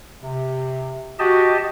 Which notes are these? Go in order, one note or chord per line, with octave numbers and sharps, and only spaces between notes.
C3
F#4 G4 D#5 A5